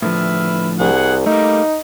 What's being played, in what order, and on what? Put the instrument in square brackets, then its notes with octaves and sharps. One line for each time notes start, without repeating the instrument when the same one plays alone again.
[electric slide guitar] A2 D3 F3 [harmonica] B4 E5 F6
[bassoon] C2 [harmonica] G#4 F#5
[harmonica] G3 A#3 [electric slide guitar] A3 [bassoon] D#4